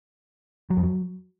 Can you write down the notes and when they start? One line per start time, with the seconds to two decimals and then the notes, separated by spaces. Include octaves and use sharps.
0.70 F#3
0.77 F2
0.83 F#3